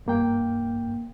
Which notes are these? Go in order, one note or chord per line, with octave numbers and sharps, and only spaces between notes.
G2 A#3 G5